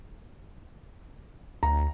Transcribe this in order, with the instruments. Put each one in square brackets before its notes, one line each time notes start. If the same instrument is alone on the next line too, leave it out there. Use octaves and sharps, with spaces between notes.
[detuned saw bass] D2 [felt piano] A#5